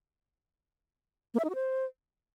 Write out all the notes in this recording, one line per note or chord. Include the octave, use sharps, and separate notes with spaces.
A#3
E5
D#4
F#4
C5